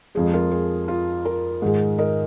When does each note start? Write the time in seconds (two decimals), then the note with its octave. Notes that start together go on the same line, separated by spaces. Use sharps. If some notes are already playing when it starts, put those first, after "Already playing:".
0.15 F2 F3 G#3 G#4
0.33 F4 A#4
0.51 G#4
0.88 F4
1.25 F4 A#4
1.62 G#2 D#3 G#3
1.98 A#4 D#5